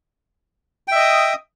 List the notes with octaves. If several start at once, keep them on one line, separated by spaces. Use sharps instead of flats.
D#5 E5 G5 D#6